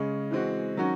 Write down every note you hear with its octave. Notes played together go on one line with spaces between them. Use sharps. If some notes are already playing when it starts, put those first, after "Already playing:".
Already playing: C#3 G#3 C#4
E3 G#3 C4 F#4
D#3 F#3 C#4 F#4